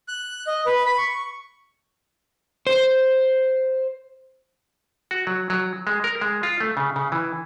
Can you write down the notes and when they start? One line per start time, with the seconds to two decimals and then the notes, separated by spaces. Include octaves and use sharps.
0.08 F#6
0.47 D#5
0.66 B4
0.86 B5
0.98 C#6
2.67 C5
5.11 F#4
5.27 F#3
5.50 F#3
5.87 G#3
6.04 A#4
6.21 G#3
6.43 F4
6.61 A3
6.77 C#3
6.96 C#3
7.12 E3